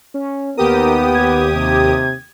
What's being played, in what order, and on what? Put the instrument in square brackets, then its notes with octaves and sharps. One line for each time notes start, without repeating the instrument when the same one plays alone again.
[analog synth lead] C#4
[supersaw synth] D#2 G4 D#6 [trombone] B3 [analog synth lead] A#4
[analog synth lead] G#6
[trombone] C3